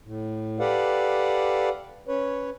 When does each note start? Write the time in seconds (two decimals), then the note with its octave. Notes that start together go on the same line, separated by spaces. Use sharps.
0.05 A2
0.59 G4 A4 B4 D5 F5 F#5
2.08 C#4 B4 C#5